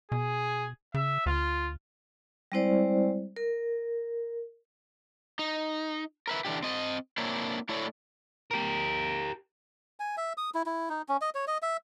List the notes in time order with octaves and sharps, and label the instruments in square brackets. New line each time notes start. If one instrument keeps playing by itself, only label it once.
[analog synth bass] B2 [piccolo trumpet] G#4
[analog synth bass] C#3 [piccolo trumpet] E5
[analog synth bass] D2 [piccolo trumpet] F4
[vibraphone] G3 G#3 C4 E4 C5 D5
A#4
[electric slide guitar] D#4
A#4 B4 E5
D3 E3 D4 D#4 G4
C4 D#5
A#3 C4 D4 E4 C#5
A3 E4 A4 C#5 D5
[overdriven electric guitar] G4 A#4
[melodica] G#5
E5
D#6
E4
E4
D#4
C#4
D#5
C#5
D#5
E5